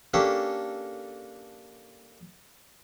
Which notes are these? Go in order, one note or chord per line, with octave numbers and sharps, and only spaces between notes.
A#3 C#4 D4 G4 A4